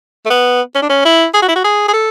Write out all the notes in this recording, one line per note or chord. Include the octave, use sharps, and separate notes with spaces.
A3
B3
C#4
D4
C#4
E4
G#4
F#4
E4
F#4
G#4
G#4
A4